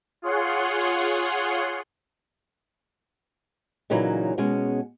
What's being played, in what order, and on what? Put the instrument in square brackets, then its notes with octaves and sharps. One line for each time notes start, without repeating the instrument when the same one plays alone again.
[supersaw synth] F4 G#4 C#5 F#5 C6
[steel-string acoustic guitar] A#2 C#3 E3 F#3 D#4
B2 G#3 C#4